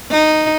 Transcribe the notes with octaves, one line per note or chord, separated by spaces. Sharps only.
D#4